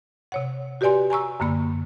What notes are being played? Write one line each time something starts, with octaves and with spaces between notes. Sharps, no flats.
C3 C#5 F#5
F#4 G4 B4 D5 G#5 C6
G#5 A#5 C#6 E6
F#2 D3 A#3 B5